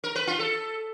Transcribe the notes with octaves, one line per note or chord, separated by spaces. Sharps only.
A#4
B4
F4
A4